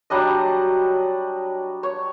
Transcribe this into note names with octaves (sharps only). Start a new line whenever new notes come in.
F#3 G3 D4 D#5
C#5